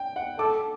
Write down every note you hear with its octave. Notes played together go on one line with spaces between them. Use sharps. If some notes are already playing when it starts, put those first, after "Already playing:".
Already playing: G5
F#5
A4 D6